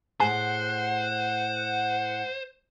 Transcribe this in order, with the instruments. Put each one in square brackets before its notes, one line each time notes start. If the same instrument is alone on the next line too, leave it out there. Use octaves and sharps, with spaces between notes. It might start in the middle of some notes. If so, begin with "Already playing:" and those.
[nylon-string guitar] A2 G#4 [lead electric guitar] C5 [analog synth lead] F#5 [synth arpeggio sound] G#5